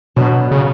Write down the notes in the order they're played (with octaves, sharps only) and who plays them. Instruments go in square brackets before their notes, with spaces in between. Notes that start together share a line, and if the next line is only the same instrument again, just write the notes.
[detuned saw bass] B2 [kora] D3 F#3 B3 F#4
[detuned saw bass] C#3